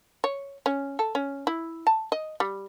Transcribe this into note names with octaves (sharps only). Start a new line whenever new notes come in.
C#5
C#4
A4
C#4
E4
A5
D#5
G3